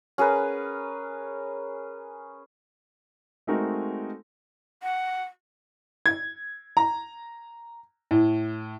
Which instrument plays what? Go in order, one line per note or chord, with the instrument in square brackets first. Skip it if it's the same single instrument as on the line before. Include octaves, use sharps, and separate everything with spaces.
[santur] C#4 G#4 A#4 B4
[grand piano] G#3 A3 C4 D#4 F#4 A#4
[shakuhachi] F#5
[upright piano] G#6
A#5
A2